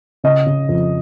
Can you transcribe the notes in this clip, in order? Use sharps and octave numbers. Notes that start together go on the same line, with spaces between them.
C#3 D#5
C#3
F2